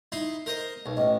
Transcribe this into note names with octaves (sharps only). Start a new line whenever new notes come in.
D#4 E4 C6
A#4 C5 D#5
B1
A1 D#5